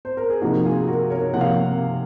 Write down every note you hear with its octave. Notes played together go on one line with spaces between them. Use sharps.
C5
A#4
G#4
C3 F3 A#3 D#4 F#4
F4 G#4
F#4 A#4
A#4 C#5
C3 F3 A#3 F#5
F5